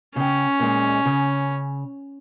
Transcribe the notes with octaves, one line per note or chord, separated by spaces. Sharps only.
C#3 C#4 G5
A#2 G#3
C#3